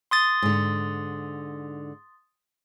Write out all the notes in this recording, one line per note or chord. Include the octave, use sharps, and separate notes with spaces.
C6 D#6 A6
G#2 D3